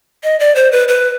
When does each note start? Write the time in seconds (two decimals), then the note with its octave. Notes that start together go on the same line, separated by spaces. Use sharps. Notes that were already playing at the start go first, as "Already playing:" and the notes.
0.23 D#5
0.40 D5
0.55 C5
0.72 B4
0.88 B4